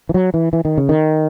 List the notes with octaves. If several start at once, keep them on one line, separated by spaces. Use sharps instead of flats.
E3
F#3
E3
E3
D#3
C#3
D#3